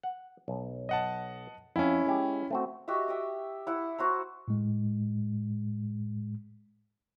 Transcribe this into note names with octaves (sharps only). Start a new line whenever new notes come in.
F#5
B1
D#5 F#5 A5
F2 C#4 E4
G#3 G4
A3 C4 F#4
F#4 G4 D#5 E5
E5 G5 D#6
E4 F#5
F#4 C5 A#5
A2 G#3